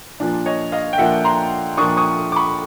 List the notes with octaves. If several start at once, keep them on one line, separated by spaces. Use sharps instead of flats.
A#2 F3 A#3 D4
C#5 D#5
D#5 F5
G5
A#2 F3 A#3 D4 E5 F#5
A#5 C6
A#2 F3 A#3 D4 C#6 D#6
C#6 D#6
D6
B5 C#6